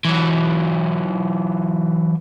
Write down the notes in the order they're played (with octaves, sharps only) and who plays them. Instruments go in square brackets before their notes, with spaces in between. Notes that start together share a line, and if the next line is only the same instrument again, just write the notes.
[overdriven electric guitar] E3 F#3